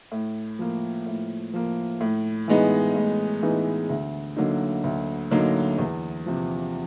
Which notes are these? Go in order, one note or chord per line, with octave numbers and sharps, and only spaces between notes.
A2
F3 A#3
A2
F3 A#3
A2
E3 G#3 B3 D#4
A2
E3 G#3 B3 D#4
D2
D3 F#3 A#3 D#4
D2
D3 F#3 A#3 D#4
E2
C3 F3